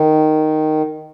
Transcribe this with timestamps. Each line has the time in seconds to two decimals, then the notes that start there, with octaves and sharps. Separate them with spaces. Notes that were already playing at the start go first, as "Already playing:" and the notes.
Already playing: D#3